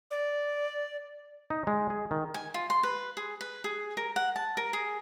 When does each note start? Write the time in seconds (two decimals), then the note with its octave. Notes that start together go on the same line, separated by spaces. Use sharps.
0.11 D5
1.50 D#4
1.67 G#3
1.90 G#4
2.11 D#3
2.34 G#5
2.54 F4
2.70 C6
2.83 B4
3.17 G#4
3.41 B4
3.64 G#4
3.97 A#4
4.16 F#5
4.36 A5
4.57 A#4
4.73 G#4